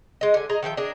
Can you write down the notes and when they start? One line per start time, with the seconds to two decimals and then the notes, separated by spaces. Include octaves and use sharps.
0.21 G#3 D#5
0.34 D3 G#5
0.49 G#4 D#5 A#5
0.63 D#3 F3 E5 G5
0.77 D4 G#4 A#4